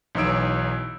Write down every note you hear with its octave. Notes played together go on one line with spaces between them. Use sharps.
B1 E3 D#4 C#5 E6 D7